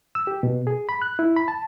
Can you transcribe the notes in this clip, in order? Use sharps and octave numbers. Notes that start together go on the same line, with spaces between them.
E6
G4
B2
G#4
B5
F#6
E4
B5
A5